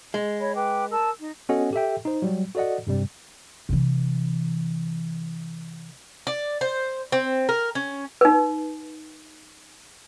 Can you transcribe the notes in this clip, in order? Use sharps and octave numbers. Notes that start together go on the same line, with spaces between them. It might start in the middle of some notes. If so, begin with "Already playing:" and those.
G#3
C#5 D#5 B5
B4 G5 D6
A#4 A5 E6
D#4
B3 C#4 F#4 A4 D#5 F#5
G4 A4 E5 G5
D#4 C5
F#3 G3
F#4 A4 D5 D#5 F#5
G2 C3 G3
C3 E3
D5
C5
C4
A#4
C#4
D#4 B4